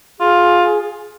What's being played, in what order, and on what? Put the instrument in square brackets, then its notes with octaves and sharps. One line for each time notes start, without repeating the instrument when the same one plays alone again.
[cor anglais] F4 [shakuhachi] G#4